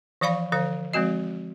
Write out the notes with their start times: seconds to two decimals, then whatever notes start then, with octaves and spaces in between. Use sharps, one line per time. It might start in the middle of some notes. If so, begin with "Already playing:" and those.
0.21 E3 F3 D5 F5 B5 C#6
0.52 D3 F3 C5 F5
0.93 F3 G#3 C4 F#4 D#5